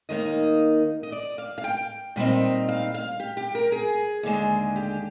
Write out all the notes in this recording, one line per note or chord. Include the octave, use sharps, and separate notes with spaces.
D#2 D#3 A#3 D#4 D#5
D#5
D5
F5
F5
G5
A#2 G3 C4 D#4
F5
F5
G4
G4
A#4
G#4
D#2 D3 G#3
G4